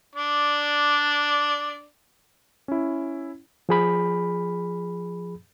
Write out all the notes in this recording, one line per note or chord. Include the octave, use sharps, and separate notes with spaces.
D4 D5
C#4 E4
F3 G#4 B5